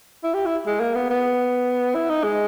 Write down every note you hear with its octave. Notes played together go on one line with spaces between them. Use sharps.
E4
G4
E4
G#3
A#3
B3
B3
E4
D#4
G#3